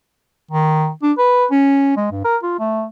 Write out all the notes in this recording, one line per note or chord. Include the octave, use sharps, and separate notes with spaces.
D#3
D4
B4
C#4
G#3
G2
A#4
F4
A3